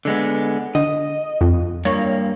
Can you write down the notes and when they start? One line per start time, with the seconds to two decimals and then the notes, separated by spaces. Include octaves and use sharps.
0.05 D3 G#3 B3
0.75 D3 D#5
1.41 F2
1.85 G2 A#3 C#5